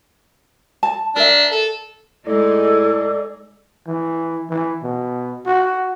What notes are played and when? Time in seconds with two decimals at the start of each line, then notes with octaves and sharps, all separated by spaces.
0.83 A5
1.16 D4 A#4 E5
1.52 A4
2.27 A2 G#3 D#4 G#4 A4 D5
3.87 E3
4.50 E3
4.83 B2
5.46 F#4